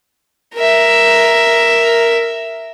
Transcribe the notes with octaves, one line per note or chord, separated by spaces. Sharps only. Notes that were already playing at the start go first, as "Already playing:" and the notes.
A#4 E5